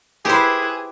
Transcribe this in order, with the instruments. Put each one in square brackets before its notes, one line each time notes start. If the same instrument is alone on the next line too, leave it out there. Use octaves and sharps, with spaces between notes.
[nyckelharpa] E4 B4 [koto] G4 C5 [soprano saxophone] G#4